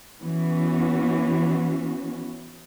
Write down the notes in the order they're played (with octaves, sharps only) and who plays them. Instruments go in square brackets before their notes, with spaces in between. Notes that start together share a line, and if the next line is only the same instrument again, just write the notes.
[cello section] E3 B3 C#4 F#4